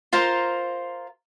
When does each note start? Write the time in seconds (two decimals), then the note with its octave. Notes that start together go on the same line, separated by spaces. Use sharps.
0.13 F4 A#4 C5 A#5